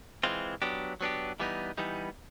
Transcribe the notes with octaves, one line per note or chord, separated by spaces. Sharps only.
E3 G#3 C4 F4
F#3 B3 D4 G4
F#3 B3 D4 G4
E3 G3 B3 D#4
E3 G3 B3 D#4